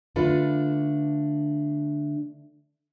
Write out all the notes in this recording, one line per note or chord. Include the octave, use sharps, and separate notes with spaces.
D3 A3 D4 F4 A4 B4